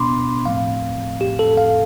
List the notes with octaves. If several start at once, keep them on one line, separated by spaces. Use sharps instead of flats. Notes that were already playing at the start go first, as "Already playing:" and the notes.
Already playing: B2 B3 D4 B5 C6 D6
A2 F3 A3 C4 F5
G4
A4
F5